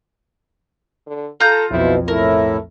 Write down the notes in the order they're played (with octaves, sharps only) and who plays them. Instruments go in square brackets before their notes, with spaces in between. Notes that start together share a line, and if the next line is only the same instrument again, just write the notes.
[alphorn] D3
[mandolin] F4 G6 [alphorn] A4 [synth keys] A#5
[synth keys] B1 F2 [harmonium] B2 [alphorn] E4
[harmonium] A2 E4 [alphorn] A3 [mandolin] A#4